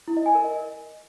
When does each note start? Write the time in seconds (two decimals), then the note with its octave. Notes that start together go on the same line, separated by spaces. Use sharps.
0.08 E4
0.17 D#5
0.26 G#5
0.35 A#4
0.44 D#5